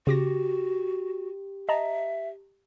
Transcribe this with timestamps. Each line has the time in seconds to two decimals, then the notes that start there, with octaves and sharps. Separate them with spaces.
0.07 C#3 F#4 G4 D6 A#6
1.69 D#5 E5 A5 A#5